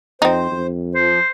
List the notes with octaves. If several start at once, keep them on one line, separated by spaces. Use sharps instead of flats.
F2 C4 D#4 C5
F2
F3 C5